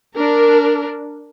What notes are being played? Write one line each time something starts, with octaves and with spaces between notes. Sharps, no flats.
D4 A#4